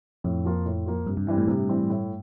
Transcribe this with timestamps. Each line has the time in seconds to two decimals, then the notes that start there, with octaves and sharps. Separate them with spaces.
0.24 F2 A2
0.45 F3 A#3 F4
0.66 A2
0.86 F3 A#3 F4
1.07 G2 C3
1.17 G2
1.27 G2 E3 G3 C4
1.38 A2
1.48 G2 C3
1.69 E3 G3 C4
1.90 A2